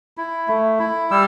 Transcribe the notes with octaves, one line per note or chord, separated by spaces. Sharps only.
E4
A3
E4
G3 E6